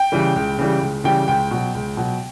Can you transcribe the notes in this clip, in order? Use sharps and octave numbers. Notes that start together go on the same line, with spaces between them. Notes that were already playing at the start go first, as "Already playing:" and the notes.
Already playing: G5
C#3 E3 G3
C#2
C#3 E3 G3
C#2
C#3 E3 G3 G5
C#2 G5
B2 F#3
C#2
B2 F#3